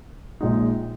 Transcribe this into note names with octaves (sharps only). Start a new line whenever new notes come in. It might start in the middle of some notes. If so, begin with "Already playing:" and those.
A#1 A#2 G#3 D#4